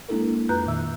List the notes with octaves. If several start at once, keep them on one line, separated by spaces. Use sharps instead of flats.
G#3 A#3 D4 E4 A4 A#4
F2 F4 B4 A#5 F#6 G6
A#2 D#3 E5 E6